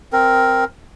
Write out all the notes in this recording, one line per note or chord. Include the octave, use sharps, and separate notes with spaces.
C4 A#4